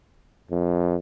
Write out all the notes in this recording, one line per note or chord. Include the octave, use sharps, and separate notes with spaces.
F2